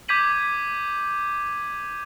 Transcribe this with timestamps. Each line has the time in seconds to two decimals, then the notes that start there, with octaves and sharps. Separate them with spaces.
0.08 D6 G6 G#6 B6 D#7 F#7